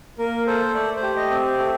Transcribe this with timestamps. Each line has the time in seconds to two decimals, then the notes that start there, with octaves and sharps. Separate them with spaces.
0.19 A#3 A#4
0.47 A4 C5
0.74 A3 D5
0.96 C5
1.03 G4
1.16 D#5
1.30 C4
1.58 A3